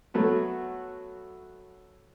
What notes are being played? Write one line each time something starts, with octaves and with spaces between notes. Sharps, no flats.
F#3 A3 B3 F#4